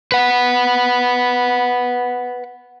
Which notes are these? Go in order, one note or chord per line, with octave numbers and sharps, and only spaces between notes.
B4 F#5